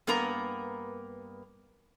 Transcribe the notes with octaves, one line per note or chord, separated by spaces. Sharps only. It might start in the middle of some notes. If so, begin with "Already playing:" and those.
G2 A#3 B3 A#4 A#5